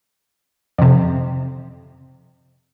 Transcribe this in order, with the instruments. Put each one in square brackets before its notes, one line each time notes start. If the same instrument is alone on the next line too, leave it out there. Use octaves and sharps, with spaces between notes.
[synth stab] F2 C3